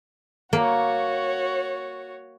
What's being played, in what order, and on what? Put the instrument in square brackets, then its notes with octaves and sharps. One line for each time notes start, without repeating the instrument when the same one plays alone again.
[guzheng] A#3 [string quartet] F#4 C#5